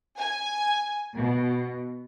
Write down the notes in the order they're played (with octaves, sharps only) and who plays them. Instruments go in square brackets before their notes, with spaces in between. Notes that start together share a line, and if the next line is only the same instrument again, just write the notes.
[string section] G#5
B2